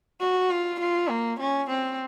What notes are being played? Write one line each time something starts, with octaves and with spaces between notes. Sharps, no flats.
F#4
F4
F4
A#3
C#4
C4